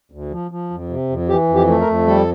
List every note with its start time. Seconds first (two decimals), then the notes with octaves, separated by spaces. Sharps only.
0.12 D2
0.31 F3
0.51 F3
0.70 F2
0.89 C3
1.09 F2
1.29 E3 G4
1.49 F2
1.55 G4
1.68 A3
1.80 A#4
1.87 F2
2.07 G3 A4